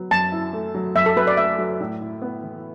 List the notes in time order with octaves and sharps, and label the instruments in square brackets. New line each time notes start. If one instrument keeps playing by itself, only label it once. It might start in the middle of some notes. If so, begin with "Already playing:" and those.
Already playing: [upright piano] F#3 B3
[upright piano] F#2 [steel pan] A5
[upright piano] E4
A3
F#3
[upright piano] F#2 [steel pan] E5
[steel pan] A4
[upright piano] F#2 [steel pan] B4
[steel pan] D5
[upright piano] A3 [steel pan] E5
[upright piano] F#3
A2
E4
B3
E3